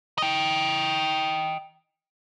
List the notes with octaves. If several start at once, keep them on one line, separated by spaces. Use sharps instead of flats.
D#5 G5